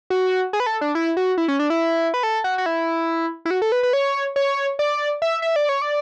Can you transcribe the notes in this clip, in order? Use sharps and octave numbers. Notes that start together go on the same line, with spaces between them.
F#4
G#4
B4
A4
D4
E4
F#4
E4
C#4
D4
E4
B4
A4
F#4
F#4
E4
E4
F#4
A4
B4
B4
C#5
C#5
D5
E5
E5
D5
C#5
D5